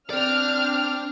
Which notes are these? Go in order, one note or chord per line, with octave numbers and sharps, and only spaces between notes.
C4 D4 D5 F6